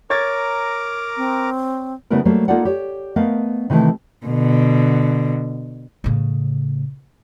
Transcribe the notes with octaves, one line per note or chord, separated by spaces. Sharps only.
A#4 C#5 A#5 D6 G#6 A6
C4
C#3 G3 A3 B3 E4 A#4
F#3 G3 A3 A#3 C5
A#3 D#4 F4 A4 D5 F#5
G4 C#5
A3 B3 A#4 D#5 F5
C3 D#3 E3 A3 E4
B2 D3
A2 C#3